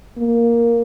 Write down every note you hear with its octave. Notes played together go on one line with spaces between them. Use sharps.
A#3